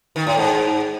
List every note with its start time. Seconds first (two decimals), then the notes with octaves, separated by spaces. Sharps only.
0.16 D#3
0.27 A2
0.37 G#2